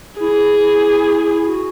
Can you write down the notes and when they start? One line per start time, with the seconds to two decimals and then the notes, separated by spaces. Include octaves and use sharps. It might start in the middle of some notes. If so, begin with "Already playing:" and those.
0.20 E4 G#4
0.63 E4
1.47 F#4